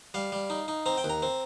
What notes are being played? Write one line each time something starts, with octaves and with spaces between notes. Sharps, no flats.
G3 F5
G3
D#4
D#4
C4 A#5
G5
D#2
A#5
C4